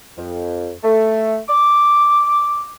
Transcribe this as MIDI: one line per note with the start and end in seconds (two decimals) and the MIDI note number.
0.17 0.71 41
0.84 1.38 57
1.49 2.74 86